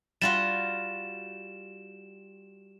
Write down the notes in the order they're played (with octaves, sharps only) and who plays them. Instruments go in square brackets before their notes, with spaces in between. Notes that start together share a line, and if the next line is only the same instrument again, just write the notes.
[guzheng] G3 F4 F#4 [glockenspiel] E7